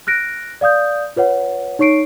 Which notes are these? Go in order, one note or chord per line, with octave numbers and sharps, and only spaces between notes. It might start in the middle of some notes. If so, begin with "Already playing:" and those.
F6 F#6 A#6 D7
D5 F5 D#6 G6
F4 B4 C#5 F#5
D#4 C#5 C#6 C7 D7